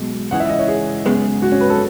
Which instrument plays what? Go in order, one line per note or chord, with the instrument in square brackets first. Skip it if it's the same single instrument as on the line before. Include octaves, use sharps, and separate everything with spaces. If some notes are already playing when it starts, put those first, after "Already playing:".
Already playing: [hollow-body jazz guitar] B1 B2 G#3
[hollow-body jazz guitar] C#2 C#3 E3 [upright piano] F#5
[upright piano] E5
D#5
C#5
G#4
[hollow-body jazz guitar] F#2 C#3 G#3 B3
[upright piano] F#4
C#4
B4
A4